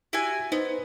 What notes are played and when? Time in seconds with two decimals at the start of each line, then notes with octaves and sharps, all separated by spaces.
0.13 E4 F#4 G4 G#5
0.52 B3 D#4 C5